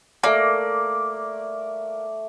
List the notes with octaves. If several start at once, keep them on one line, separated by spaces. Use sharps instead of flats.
A3 A#3 D5